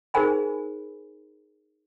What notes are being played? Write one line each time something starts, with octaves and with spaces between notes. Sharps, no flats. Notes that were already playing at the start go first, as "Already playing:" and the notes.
D#4 G#4 A#4 C5 G#5 B5